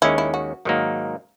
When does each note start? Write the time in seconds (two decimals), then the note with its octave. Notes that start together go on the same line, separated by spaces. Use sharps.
0.02 D#2 D#3 G#3 C#4 E4
0.18 E4
0.34 F#4
0.65 G#2 D#3 F#3 A#3 D#4